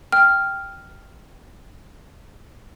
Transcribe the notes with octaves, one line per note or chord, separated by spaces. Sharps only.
G5 F6